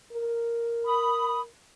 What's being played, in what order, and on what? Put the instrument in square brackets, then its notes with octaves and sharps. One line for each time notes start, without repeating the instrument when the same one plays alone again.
[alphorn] A#4
[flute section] B5 D#6